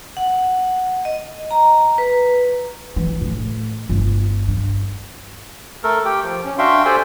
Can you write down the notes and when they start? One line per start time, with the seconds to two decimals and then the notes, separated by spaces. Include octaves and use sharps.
0.17 F#5
1.05 D#5
1.51 A#5
1.98 B4
2.96 E3
3.21 A2
3.89 G1
4.48 G2
5.83 A3 A4 A#4
6.05 G4 G5
6.23 F3
6.45 C#4
6.58 D4 F#4 E5 F5 G5 C6
6.85 G4 A4 C5 D5 G5 G#5